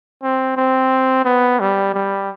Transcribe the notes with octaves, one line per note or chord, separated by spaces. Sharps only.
C4
C4
B3
G3
G3